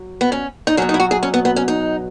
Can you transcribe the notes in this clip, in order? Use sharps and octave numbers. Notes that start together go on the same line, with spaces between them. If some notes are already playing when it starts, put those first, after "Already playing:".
Already playing: F#3
B3
C#4
D#4
B2 F#3 C#4
D#4
E4
F#4
G#4
C#4
B3
B3
C#4
D#4